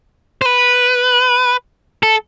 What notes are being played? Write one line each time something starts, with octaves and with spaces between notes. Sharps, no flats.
C5
B4
A4